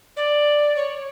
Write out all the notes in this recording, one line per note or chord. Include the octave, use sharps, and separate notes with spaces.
D5
C#5